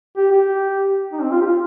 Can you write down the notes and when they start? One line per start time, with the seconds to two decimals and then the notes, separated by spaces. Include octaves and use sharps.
0.17 G4
0.32 G4
1.12 D#4
1.22 C4
1.31 F4
1.41 G4
1.46 F4